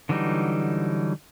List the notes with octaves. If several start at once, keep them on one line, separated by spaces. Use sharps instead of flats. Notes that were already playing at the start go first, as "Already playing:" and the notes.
D3 E3 F#3 G3 D#4